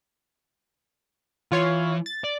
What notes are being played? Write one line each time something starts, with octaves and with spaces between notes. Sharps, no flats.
E3 F4 C#5 F5
A6
D5